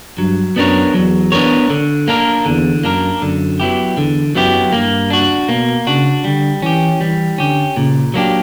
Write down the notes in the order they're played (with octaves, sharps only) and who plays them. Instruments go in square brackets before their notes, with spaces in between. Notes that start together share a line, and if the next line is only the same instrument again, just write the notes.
[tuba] G2 [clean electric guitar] F#3
[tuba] F#2 [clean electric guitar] B3 D4 A#4 C#5
[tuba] E2 [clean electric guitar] F#3
[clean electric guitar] B3 D4 A#4 C#5
D3
A#3 D4 A#4
[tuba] E2 [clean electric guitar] D3
[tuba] F#2 [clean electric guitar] A#3 D4 A#4
[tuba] F#2 [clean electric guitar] D3
[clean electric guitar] F#3 B3 E4 G4
[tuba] E2 [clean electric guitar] D3
[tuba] F#2 [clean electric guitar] F#3 B3 E4 G4
[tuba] G2 [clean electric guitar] A#3
[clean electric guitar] D4 F#4
[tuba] B2 [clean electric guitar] A#3
[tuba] C#3 [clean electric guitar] D4 F#4
[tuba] D3 [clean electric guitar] G3
[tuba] E3 [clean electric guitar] C#4 G4
[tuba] E3 [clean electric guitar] G3
[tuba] D3 [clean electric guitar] C#4 G4
[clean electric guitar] A#2 [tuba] C#3
[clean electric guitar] F#3 A#3 D4 G4